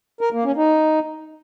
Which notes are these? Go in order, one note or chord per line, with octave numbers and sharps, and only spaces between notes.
A#4
A#3
C#4
D#4